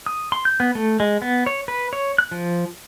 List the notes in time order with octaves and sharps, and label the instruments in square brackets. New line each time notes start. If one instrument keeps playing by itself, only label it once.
[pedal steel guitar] D#6
C6
G6
B3
A3
G#3
B3
C#5
B4
C#5
F#6
F3